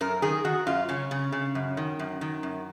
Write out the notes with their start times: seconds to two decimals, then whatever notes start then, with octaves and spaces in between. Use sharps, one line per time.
0.01 F#2 A#4
0.22 D#3 G#4
0.45 D#3 F#4
0.67 F#2 F4
0.89 C#3 C#4
1.11 C#3
1.32 C#3
1.55 F#2
1.77 D#3
1.99 F#2
2.21 D#3
2.43 F#2